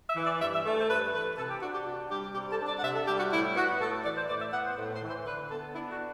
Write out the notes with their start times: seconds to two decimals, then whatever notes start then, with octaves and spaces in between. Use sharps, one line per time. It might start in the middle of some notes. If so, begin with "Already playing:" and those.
0.09 E5
0.16 E3
0.25 D5
0.41 G2 E5
0.53 E5
0.65 A3
0.78 C5
0.89 G2 B4
1.13 E3 B4
1.37 C3 A4
1.50 G4
1.62 D4 F#4
1.74 G4
1.86 C3 F#4
2.11 G3 G4
2.34 C3 G4
2.51 A4
2.60 D4
2.68 D5
2.79 F#5
2.83 C3 E5
2.95 A4
3.07 G3 G4
3.19 F#4
3.33 A2 E4
3.56 B3 F#4
3.81 A2 A4
4.04 E3 D5
4.16 C5
4.29 A2 D5
4.41 E5
4.53 B3 F#5
4.65 C5
4.78 A2
4.94 C5
5.02 E3
5.10 C5
5.27 D3 B4
5.50 B3 A4
5.74 D4 E4
5.90 F#4